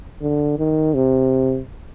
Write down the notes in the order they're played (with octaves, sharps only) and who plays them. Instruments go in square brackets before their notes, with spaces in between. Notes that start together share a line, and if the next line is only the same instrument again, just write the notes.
[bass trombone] D3
D#3
C3